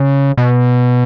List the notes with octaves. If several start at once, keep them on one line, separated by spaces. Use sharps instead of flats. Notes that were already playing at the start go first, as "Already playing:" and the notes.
Already playing: C#3
B2